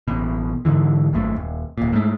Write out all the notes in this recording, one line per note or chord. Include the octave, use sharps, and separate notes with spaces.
A1 B2
G#2 B2 D3 E3
G#1 F#2 A3
D#1
D1 A#2
G#2 A3